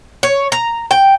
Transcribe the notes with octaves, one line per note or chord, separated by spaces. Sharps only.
C#5
A#5
G5